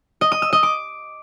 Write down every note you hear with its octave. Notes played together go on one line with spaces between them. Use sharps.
D#5
D#6
E6
D#5
D6